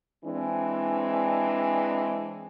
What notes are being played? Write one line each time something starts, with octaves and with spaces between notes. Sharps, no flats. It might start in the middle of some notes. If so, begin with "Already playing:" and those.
E3 G#3 C4 D4